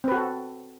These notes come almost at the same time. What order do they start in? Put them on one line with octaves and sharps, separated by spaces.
C4 B4 F#4 A4